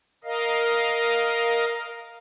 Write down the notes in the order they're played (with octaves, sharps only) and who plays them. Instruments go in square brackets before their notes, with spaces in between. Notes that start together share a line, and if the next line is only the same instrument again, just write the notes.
[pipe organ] A#4 D#5 F5